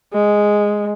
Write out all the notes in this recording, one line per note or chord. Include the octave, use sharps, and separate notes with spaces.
G#3